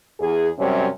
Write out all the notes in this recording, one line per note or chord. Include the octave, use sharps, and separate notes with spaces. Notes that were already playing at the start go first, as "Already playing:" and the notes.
E2 G#4
F#2 C3 G3 C#4